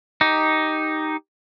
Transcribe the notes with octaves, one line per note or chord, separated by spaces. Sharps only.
D#4 G4